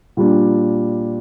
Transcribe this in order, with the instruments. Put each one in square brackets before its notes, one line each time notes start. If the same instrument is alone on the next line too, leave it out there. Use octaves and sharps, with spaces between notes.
[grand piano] A#2 G3 D4